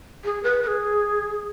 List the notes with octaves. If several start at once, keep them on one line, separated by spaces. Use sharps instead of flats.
G#4
B4
B4
G#4